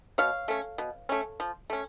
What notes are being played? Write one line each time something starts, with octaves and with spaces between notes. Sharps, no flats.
B2 C#5 F5
A3 C#4
B2
A3 C#4
F3
A3 C#4